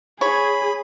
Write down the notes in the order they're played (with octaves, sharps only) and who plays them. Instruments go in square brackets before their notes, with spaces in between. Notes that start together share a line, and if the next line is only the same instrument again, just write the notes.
[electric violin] G#4 [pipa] C#5 [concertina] B5